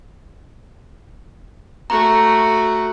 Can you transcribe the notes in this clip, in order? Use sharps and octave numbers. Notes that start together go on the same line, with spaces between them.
A3 F#4 A#5